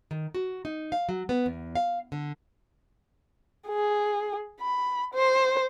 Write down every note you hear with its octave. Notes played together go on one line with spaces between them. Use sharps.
D#3
F#4
D#4
F5
F#3
B3
E2
F5
D3
G#4
B5
C5